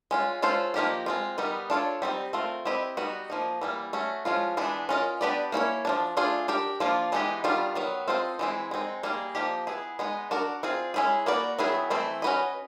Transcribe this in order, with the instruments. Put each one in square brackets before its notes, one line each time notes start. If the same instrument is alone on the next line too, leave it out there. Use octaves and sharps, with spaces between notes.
[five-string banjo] G#3 C#4 F4
G#3 C#4 F4 A4 C5
F3 A#3 D#4 G4 A#4
G#3 C4 F4
D#3 G3 B3 D#4
D4 F4 A4 C#5
G3 C4 D#4
A3 C4 F4 A#4
C4 E4 G4 B4 D#5
G3 B3 D#4 F#4
F3 A#3 D#4
E3 G3 A#3
A3 C#4 F#4
F3 G#3 C#4 F4
E3 G#3 B3 D4
C#4 F4 A#4 D#5
B3 D4 G4 B4 D5
A#3 C#4 E4 A4 C#5
F3 A#3 D4
A3 D4 F4 G#4
D4 G4 A#4
F3 A#3 D4 F4
E3 G#3 B3 D#4 G4
D#3 G3 B3 D4 F4
D#3 F#3 B3
C4 F4 A4 C5 D#5
E3 G#3 C4 E4
G#3 C4 D#4
G3 A#3 D#4 G#4
F3 A#3 D#4 G4
B3 E4 G#4
G#3 B3 D#4
D4 F#4 A#4
C4 F4 G#4
G#3 C#4 E4 G#4
A#3 D#4 F#4 B4 D5
D#3 F#3 B3 E4 G#4
E3 A3 C4 E4
C#4 F#4 B4 D#5